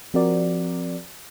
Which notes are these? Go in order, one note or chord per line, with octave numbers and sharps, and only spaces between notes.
F3 C4 F#4 A#4 D5